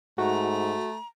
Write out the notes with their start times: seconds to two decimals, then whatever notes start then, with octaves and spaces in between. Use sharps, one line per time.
0.18 G#2 A3 F#4 A#5